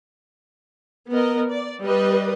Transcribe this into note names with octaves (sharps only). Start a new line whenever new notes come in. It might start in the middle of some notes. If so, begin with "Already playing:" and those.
B3 A#4 D#5
D5
G3 B4 D#5